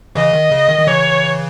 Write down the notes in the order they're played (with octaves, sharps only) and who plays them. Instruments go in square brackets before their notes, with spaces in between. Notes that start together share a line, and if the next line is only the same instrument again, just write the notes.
[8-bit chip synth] C#3 E3 [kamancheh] D#5
[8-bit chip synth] D#3
C#3
D#3
D#3
[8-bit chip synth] C#3 E3 [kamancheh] C#5